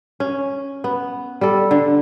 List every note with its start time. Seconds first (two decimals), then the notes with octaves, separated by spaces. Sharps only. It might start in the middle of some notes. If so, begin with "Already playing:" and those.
0.20 C#4
0.84 B3
1.41 G3 A4
1.71 D3